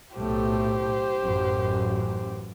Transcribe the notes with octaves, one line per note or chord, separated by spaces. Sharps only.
B1 A2 A3 G4 C5
A1 F#2